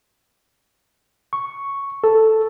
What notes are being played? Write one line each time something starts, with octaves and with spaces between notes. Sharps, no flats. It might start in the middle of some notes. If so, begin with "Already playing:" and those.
C#6
A4